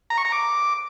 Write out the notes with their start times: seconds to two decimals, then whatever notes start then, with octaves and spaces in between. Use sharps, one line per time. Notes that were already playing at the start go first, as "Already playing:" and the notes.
0.10 A#5
0.18 C#6
0.25 A#5
0.32 D6